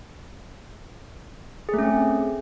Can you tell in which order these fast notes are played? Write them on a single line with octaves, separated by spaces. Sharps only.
G#4 A3 C#4 C4